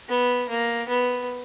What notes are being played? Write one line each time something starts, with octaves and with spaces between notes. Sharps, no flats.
B3
A#3
B3